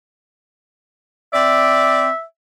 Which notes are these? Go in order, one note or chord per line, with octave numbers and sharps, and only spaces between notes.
C4 D5 E5